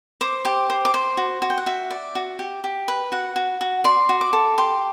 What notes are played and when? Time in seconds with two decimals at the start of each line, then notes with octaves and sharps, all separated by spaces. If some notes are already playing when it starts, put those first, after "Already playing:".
0.21 C5 D6
0.45 G4 D6
0.70 C5
0.85 D6
0.94 C5 C6
1.17 F#4
1.42 F#4
1.50 G5
1.58 F#5
1.66 F#4 E5
1.91 D5
2.15 F#4
2.39 G4
2.64 G4
2.88 B4
3.12 F#4 F#5
3.36 F#4
3.61 F#4
3.84 D5 C6
4.09 F#4
4.21 D6
4.33 A4
4.58 G4 C6